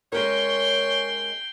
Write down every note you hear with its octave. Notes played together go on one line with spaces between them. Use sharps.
G#3 C#4 A#4 C#5 G5 C6